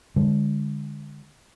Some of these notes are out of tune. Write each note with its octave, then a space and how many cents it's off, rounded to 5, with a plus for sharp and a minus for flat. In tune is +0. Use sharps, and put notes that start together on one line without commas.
D3 +0 G#3 -20